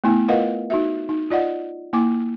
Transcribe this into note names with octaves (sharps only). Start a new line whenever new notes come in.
A3 B3 E4 G#5
F4 A#4 B4 D#5 F5 F#5
D#4 F#4 E5
D#4
F4 D5 D#5 F#5
A#3 E4 G#5 D6